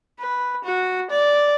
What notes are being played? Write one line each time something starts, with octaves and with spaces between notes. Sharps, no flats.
B4
F#4
D5